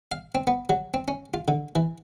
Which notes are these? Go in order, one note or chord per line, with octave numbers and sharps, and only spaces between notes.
F5
C4
B3
F#3
C4
C#4
F4
D3
E3